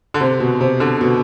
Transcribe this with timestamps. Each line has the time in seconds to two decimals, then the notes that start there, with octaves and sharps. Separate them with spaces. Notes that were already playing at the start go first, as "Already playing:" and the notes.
0.14 D3
0.21 C3
0.40 B2
0.61 C3
0.80 D3
1.01 B2